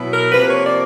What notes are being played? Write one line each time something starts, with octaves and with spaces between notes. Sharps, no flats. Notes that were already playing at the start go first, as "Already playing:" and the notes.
Already playing: B2 F#3 B3 E4
A#4
C3 F3 A#3 B4
C#5
D5